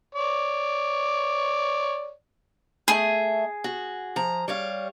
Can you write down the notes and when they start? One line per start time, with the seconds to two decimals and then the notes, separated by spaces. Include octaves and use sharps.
0.15 C#5 D5
2.88 A3 G#4 E5
3.64 F#4
4.16 F3 A#5
4.48 G3 C#5 F5